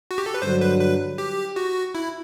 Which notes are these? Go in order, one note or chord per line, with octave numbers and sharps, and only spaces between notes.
F#4
G4
A4
B4
G2 D3 F#3 C5
B4
B4
G4
F#4
E4